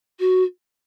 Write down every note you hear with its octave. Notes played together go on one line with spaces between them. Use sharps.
F#4